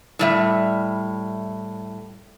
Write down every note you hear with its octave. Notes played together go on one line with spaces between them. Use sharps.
A2 G3 E5